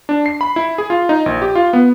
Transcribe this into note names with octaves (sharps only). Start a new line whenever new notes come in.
D4
C7
B5
E4
G#4
F4
D#4
A#1
G4
F4
B3